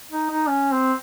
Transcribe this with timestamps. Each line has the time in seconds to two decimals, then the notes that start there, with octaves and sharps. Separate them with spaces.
0.11 D#4
0.30 D#4
0.47 C#4
0.72 C4